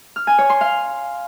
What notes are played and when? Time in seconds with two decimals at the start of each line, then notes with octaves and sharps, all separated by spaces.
0.16 F6
0.27 G#5
0.38 C#5
0.50 C6
0.61 F5